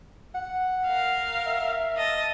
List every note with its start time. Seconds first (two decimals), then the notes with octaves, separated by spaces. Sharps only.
0.35 F#5
0.87 A#4 F5
1.47 E5
1.97 D#5 A5